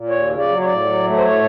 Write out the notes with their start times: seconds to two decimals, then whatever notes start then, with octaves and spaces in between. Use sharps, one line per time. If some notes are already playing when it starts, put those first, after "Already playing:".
Already playing: A#2
0.09 D#2 C#5
0.29 C#3
0.38 D5
0.48 F#3
0.60 C#5
0.65 A2 D5
0.85 F#3
1.04 A3
1.17 C5
1.22 A2 C#5